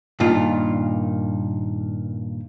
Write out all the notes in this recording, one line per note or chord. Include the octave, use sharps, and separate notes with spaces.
G2 A#2 D#3 F4